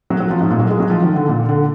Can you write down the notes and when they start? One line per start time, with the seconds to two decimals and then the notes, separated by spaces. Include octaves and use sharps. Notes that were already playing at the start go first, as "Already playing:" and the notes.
0.10 F#3
0.20 F#3
0.30 F3
0.41 G#2
0.50 A#2
0.59 F#3
0.70 G#3
0.80 F#3
0.90 F3
1.02 D#3
1.16 D3
1.28 A#2
1.49 D3